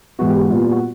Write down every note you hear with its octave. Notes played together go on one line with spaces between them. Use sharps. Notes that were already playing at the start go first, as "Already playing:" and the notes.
G#2 E3 G#3 B3 F#4
G4
F#4
A#2 G3 B3 F4
F4
F#4